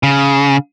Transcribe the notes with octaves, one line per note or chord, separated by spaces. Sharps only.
C#3